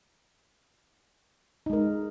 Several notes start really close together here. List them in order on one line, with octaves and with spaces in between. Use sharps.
D#4 G#3 A#4